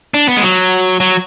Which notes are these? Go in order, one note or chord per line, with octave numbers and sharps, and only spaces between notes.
D4
B3
G#3
F#3
F#3